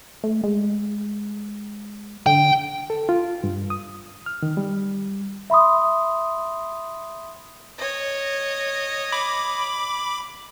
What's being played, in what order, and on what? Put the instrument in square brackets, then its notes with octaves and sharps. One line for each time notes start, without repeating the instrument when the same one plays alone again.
[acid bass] A3
G#3
[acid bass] D3 [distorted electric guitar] G5
[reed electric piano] A4
F4
G2
D#6
F6
D#3
G3
[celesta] E5 B5 C6 D#6
[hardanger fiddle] C#5 D#5
[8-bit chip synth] B5 D6